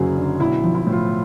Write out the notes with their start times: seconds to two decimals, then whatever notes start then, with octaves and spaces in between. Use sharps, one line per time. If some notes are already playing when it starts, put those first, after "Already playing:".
Already playing: F#1 F#2 D3 F#3 G#4
0.17 D3
0.40 B1 E4
0.63 F3
0.75 E4
0.86 A2
0.92 F4